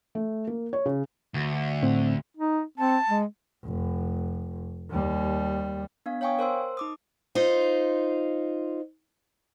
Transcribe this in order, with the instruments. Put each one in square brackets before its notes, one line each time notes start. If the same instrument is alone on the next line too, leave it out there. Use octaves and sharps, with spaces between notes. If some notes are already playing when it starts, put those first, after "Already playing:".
[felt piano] A3
A#3
C#5
C#3
[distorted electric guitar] D2
[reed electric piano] A2 C4
[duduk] D#4
[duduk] C4 [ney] A5
[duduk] G#3
[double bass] F1
D#2 G3
[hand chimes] B3 D4 F5
C#5 F5 G5 G#5 C#6 D#6
A#4 C5 C6 E6
D#4 D6 D#6
[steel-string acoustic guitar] D#4 F4 C5